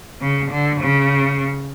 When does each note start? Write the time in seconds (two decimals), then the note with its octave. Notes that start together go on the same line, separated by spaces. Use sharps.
0.21 C#3
0.51 D3
0.80 C#3